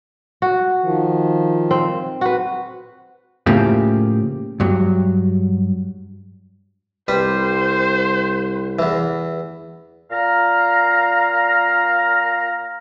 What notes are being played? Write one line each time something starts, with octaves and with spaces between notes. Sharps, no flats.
F#4
D#3 F3
C4
F#4 B4
A2 C#3 F3 A#3 G4
G2 F#3
C2 G3 B4 C5
E2 E3
A#2 F5 A#5